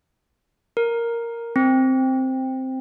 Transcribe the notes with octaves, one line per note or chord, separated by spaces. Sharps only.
A#4
C4